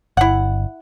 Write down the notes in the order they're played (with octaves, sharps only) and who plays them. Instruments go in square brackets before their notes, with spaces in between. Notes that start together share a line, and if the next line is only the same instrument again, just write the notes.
[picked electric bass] G1 [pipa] E4 F#5